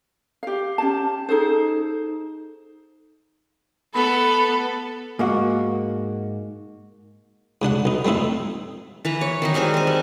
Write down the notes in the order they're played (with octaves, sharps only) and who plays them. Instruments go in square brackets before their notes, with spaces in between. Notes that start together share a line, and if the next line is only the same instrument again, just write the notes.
[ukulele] G4 F5
C#4 G4 A5
D#4 G#4 A4 C5
[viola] B3 A4 [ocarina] B5
[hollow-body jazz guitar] G#2 A#3 F#4
[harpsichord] G#2 C3 D4 F#5
B1 D#4
G3 A3 C4 D#4 E4
[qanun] E3 B4 A#5
C#5
D#3 F#3 D#4
G3 G#3 C4 G#5
C5 G#5
G3